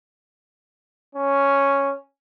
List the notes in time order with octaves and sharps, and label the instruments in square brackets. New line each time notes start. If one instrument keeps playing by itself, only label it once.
[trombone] C#4